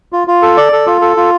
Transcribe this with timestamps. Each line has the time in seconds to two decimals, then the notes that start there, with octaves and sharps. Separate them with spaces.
0.13 F4
0.28 F4
0.42 A4
0.57 D5
0.72 A4
0.87 F4
1.01 A4
1.17 F4